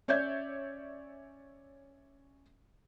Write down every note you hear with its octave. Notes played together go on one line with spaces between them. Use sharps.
C#4 C#5 D5 E5 G6 G#6